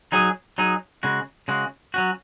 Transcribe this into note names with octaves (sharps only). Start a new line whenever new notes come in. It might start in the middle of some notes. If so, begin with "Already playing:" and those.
F#3 D#4 G#4
F#3 D#4 G#4
C#3 G#3 F#4
C#3 G#3 F#4
F#3 C#4 F#4